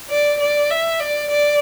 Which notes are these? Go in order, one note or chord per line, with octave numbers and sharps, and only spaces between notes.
D5
D5
E5
D5
D5